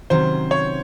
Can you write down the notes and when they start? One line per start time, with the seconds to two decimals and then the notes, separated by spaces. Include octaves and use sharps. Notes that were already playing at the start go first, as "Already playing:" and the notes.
0.10 C3 D#3 F#3 C#4 C5
0.51 C#5